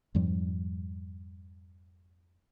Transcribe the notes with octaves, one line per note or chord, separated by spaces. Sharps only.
F2 G#2 F3 G3